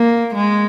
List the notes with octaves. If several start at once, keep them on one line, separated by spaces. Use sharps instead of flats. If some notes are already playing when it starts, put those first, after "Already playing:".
Already playing: A#3
G#3